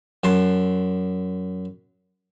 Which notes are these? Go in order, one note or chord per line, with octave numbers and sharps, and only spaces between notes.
F#2 A5 C6